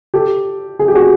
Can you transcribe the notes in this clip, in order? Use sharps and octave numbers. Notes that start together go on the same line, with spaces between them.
G4 A4
G#4
G4
F#4 G#4